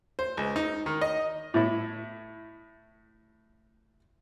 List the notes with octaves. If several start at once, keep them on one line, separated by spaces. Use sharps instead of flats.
C5
C#2
D#4
D#3
D#5
A2 E4